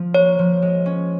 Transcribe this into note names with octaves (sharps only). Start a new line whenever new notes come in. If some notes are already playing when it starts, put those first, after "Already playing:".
Already playing: F3
A#3 C#5
F3
G#3
C#4